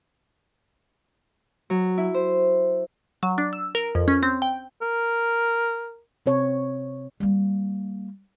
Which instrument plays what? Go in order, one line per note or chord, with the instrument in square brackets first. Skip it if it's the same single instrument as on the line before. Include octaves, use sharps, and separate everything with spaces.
[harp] F#3
E4
C5
[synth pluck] F#3
D4
E6
A#4
F2
C#4
C4
G5
[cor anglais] A#4
[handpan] C3 C4 C#5
[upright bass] G3 A#3